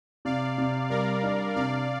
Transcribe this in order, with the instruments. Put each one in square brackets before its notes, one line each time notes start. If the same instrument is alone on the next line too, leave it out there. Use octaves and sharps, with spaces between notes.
[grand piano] C3 [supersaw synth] D5 F5
[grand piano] C3
[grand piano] G3 [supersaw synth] A#4 D5
[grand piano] D4
[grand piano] C3 [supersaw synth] D5 F5